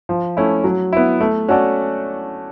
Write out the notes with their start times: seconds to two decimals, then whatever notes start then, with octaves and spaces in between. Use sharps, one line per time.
0.09 F3
0.37 A3 C#4 E4
0.64 F#3
0.93 B3 E4
1.21 A3
1.48 C#4 F#4 A4 D5